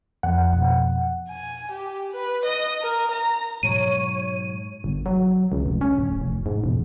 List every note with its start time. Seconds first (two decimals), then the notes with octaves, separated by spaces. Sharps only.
0.23 F2 F#5
0.52 B2
1.29 G#5
1.72 G4
2.12 B4
2.45 D#5
2.81 A#4
3.11 A#5
3.63 G#2 B2 F#3 C#5 D#7
4.84 G1
5.06 F#3
5.52 C#2
5.66 F1
5.81 C#4
5.98 D1
6.22 F1
6.46 G#2
6.64 E1